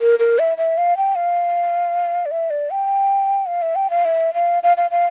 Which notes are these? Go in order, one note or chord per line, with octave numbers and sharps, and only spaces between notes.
A#4
A#4
E5
E5
F5
G5
F5
D5
E5
D5
G5
F5
E5
G5
F5
E5
F5
F5
F5
F5